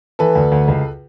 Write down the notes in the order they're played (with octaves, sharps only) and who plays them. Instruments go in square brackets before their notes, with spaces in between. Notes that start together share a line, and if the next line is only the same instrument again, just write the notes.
[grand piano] E3 A4 B4
D2
D2
C#2